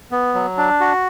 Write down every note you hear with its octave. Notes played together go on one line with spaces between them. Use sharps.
B3
F#3
D4
F#4